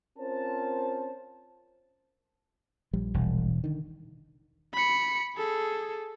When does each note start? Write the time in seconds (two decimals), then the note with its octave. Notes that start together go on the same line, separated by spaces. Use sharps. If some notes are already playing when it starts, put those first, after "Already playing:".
0.17 C4 C#4 F4 A#4 C5 A5
2.93 A#1 F3 G3
3.14 E1
3.64 D3 D#3
4.74 B5 C#7
5.36 G#4 A4